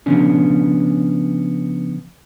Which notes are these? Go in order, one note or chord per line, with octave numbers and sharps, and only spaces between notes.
C#3 F3 B3 C#4 D4